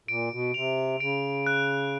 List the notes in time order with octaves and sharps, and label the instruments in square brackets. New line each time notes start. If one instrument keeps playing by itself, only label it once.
[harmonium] A#2 [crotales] D7
[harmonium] B2
[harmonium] C3 [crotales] F7
[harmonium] C#3 [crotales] D7
[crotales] F#6